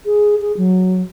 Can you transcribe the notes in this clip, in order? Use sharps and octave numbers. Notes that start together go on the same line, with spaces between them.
G#4
G#4
F#3